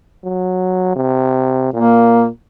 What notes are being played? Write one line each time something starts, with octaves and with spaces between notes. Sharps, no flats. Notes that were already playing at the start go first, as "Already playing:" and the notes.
F#3
C3
A#2 A#3